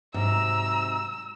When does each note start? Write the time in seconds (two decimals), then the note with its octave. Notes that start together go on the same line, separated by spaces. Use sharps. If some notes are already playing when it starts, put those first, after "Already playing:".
0.14 G#2 C3 F#3 A#5 E6